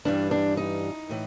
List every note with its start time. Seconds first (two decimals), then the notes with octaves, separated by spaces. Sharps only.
0.05 G2 E3 G3 D4
0.31 D4
0.57 D#4
1.09 A2 E3